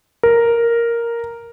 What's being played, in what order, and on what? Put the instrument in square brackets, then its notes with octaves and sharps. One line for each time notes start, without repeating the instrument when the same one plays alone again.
[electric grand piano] A#4